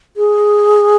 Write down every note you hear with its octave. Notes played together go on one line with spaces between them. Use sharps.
G#4